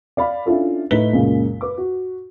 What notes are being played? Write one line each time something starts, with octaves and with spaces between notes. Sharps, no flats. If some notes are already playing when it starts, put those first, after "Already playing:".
D5 F5 B5
C#4 D4 E4 F4 A4
A2 A3 D#4 B4 B6 G7
C#2 F#2 A#2 C#3 G#3
B4 D6
F#4